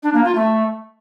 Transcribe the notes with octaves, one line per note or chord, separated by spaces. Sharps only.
D4
A#3
F4
A3